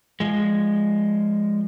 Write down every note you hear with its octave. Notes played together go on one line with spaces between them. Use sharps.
F3 G#3